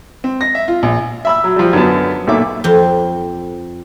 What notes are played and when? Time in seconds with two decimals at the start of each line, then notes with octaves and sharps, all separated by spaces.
0.24 C4
0.41 A#6
0.55 E5
0.68 F4
0.83 A#1
1.25 E5 B5 E6
1.44 F#3
1.56 F3 G3
1.73 F#2 D3 F#3 B3 A5
2.27 B1 A#2 A4 E5 D6
2.64 F2 C4